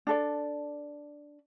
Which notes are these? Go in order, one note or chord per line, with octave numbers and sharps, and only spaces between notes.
D4 A4 D5